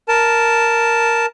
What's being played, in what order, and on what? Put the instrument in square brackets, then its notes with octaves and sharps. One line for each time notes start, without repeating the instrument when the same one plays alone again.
[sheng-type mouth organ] A#4 A5